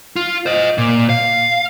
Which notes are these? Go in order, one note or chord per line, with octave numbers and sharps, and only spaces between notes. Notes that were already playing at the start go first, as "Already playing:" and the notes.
F4
C5 D#5
A#2
F5